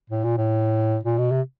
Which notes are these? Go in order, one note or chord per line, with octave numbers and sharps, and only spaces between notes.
A2
A#2
A2
A#2
B2
C3